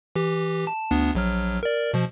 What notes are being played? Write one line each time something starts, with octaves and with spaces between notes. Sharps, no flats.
E3 G4
A5
D2 B3 D4
A#1 F#3 F6
A#4 D5
B2 F3